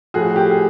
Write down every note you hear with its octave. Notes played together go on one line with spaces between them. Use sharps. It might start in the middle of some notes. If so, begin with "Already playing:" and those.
A2 F3 A3 F#4 G#4
G4
G#4